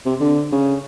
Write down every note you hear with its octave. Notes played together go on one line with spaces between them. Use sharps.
C3
D3
C#3